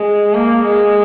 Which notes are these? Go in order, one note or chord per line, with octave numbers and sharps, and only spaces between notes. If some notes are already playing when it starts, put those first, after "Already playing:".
Already playing: G#3
A#3
G#3